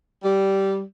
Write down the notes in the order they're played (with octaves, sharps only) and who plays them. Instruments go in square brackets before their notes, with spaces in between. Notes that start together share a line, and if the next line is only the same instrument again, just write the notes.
[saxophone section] G3